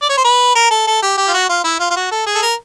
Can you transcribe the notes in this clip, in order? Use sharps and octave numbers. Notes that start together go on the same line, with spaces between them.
D5
C#5
C5
B4
A#4
A4
A4
G4
G4
F4
F#4
F4
E4
F4
F4
F#4
A4
G#4
A4
A#4